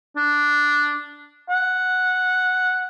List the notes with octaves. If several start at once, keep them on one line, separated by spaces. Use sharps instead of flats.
D4
F#5